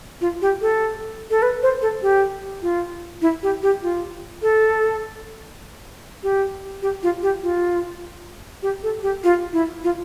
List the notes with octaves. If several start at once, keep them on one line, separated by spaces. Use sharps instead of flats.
F4
G4
A4
A4
B4
C5
A4
G4
F4
E4
G4
G4
F4
A4
G4
G4
F4
G4
F4
G4
A4
G4
F4
E4
F4